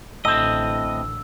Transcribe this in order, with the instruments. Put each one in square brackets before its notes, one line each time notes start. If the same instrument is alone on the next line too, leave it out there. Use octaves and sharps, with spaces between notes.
[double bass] A1 D3 [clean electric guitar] A2 C4 [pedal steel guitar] D#5 [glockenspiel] E6